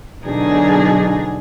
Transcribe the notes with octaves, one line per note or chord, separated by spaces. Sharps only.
B2 D3 F#3 D4 D#4 G#4